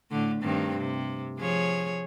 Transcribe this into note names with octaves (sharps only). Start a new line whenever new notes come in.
A2 D3 A3
G2 D#3 C4
C3
F3 G#4 C#5